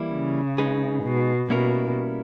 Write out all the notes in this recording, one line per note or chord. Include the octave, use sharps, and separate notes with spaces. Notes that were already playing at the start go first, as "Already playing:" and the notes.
Already playing: E3 G3 A#3 E4
C#3
G#3 D#4 G#4 B4
B2
B2 G3 A#3 C#4 E4 A#4